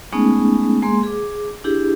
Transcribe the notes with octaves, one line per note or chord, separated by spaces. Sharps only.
G#3 A3 B3 C#4 D#4 G#4
G#3 A#3 G#4 C6
G#4 D6
D4 E4 G4 G#4